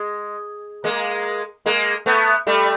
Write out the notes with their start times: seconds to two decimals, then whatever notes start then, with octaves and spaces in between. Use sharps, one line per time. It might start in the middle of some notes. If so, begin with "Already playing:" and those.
Already playing: G#3
0.84 G#3 A#3
1.66 G#3 A#3
2.06 A3 B3
2.47 G3 A3